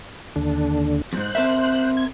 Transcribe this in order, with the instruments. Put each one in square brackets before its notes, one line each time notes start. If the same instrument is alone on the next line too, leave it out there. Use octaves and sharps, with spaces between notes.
[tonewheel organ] D#2 D3 D4
[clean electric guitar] F2 G#2 [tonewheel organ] C5 F#6
[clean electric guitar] C4 A#4 E5
[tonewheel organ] G#6